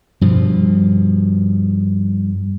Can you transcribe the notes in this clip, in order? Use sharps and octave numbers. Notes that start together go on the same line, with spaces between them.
G2 B2 F3